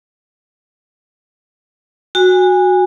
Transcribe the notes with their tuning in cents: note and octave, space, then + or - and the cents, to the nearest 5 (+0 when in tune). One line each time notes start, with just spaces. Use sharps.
F#4 -10 G#5 -25